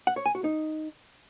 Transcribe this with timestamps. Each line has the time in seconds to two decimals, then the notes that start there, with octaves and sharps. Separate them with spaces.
0.07 F#5
0.16 C#5
0.26 G#5
0.35 F#4
0.44 D#4